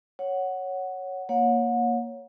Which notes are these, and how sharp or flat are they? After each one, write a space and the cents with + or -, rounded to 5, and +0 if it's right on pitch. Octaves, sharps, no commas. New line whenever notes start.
C#5 +0 F#5 +0
A#3 +5 C#5 +0 F#5 -35